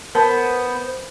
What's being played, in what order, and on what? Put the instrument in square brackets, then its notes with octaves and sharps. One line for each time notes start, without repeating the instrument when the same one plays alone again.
[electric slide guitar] B3 [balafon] A#4 A5 [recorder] C5